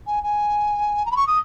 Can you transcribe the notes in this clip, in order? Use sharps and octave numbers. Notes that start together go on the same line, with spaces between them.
G#5
G#5
A#5
B5
C#6
D#6